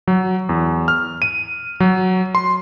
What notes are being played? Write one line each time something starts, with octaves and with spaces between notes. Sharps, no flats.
F#3
E2
F6
D#7
F#3
C6